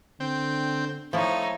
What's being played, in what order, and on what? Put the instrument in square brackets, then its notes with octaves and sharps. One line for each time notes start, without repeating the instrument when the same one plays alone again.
[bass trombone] D3 [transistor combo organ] C4 G5
[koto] F3 E4 [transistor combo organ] A3 [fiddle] D#4 C#5